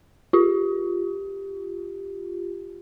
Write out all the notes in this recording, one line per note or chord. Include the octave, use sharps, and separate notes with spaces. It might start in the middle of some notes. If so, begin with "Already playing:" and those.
F4 G4